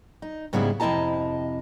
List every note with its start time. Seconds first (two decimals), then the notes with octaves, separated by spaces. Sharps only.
0.22 D#4
0.53 G#2 C#3 G3 B3 E4 G#4
0.80 F2 C3 E4 D#5 A5 A#5